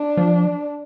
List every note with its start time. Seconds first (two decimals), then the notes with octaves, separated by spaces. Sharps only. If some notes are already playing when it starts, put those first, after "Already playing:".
Already playing: D4
0.17 F3